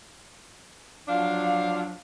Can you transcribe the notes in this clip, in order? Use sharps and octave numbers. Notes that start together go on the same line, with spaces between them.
F3 F#3 D4 F5